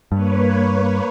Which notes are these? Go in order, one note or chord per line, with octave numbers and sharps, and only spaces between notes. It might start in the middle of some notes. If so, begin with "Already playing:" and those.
G2 A#3 B4 C#5